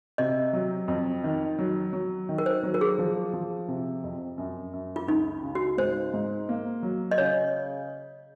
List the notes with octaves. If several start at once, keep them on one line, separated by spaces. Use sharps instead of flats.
C3 D#5
F#3
F2
D#3
F#3
F#3
D#3
A#4
C5
F#3
A#4
G#4
F3
F3
C3
F2
F#2
F#2
F4
C#2 D#4
C#3
F#4
G#2 C5
G#2
A#3
F#3
D#5
C#3 C#5